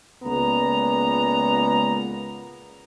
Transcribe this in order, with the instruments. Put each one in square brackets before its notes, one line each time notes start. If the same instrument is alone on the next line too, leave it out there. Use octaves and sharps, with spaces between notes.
[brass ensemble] C#2 A#2 B3 A#5